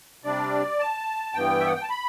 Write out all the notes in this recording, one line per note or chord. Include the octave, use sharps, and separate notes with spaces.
C3 G3 D4 D5
A5
G2 E3 B3 G5
E5
F#5
G5
A5
B5